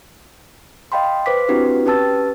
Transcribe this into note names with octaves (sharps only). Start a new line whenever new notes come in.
D#5 F5 G5 B5 C6
B4 C5 D6 B6
C4 D4 E4 F#4 G4 B4
C#4 G4 B4 A5 E6 A6